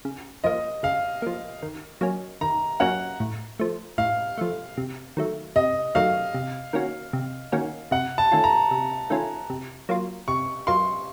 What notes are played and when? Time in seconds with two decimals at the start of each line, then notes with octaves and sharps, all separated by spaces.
0.05 C#3
0.44 F3 A#3 D#5
0.83 C#3 F5
1.22 F3 A#3
1.63 D#3
2.01 F#3 A#3 C#4
2.41 D#3 A#5
2.80 F#3 A#3 C#4 F#5
3.20 A2
3.59 F3 A3
3.98 A2 F5
4.37 F3 A3
4.77 C3
5.17 D#3 F#3 A3
5.56 C3 D#5
5.95 D#3 F#3 A3 F5
6.34 C3
6.73 D#3 A#3 C#4 F#4
7.13 C3
7.52 D#3 A#3 C#4 F#4
7.91 C3 F#5
8.18 A5
8.32 D#3 A3 C#4 F4
8.44 A#5
8.71 C3
9.10 D#3 A3 C#4 F4
9.50 C3
9.89 F#3 A#3 F4
10.28 C3 C#6
10.67 F#3 A#3 F4 C6